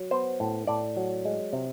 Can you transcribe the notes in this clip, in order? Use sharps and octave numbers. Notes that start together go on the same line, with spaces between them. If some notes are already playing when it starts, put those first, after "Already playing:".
Already playing: F#3
B3 C5
A2
A2 D5
F#3
G#3
C3